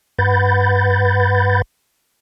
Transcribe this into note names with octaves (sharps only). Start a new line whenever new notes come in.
G2 B4 F#5 B5 G6 A6